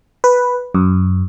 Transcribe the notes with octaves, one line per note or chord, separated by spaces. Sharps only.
B4
F#2